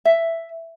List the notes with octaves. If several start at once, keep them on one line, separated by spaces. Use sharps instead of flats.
E5